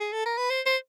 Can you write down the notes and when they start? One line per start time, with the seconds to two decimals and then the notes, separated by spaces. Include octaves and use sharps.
0.00 G#4
0.12 A4
0.25 A#4
0.38 B4
0.50 C5
0.66 C5